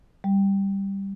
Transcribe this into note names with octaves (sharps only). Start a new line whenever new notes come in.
G3